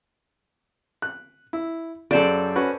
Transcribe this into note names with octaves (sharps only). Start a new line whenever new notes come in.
F#6
E4
F#2 C#3 A4 C5 D5
C#4 F#4 B4